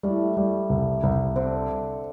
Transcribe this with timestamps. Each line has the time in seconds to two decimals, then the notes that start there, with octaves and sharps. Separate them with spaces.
0.03 A2 G3 A3
0.37 G3
0.70 C2
1.03 C2
1.36 D3 C4 D4